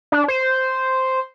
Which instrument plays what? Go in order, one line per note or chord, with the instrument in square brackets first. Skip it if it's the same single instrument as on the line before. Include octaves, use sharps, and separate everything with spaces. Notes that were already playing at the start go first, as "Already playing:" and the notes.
[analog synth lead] D4
C5